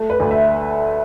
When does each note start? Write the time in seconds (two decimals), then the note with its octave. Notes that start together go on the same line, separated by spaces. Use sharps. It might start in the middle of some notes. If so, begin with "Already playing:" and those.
Already playing: A3
0.10 B4
0.20 D2
0.31 E5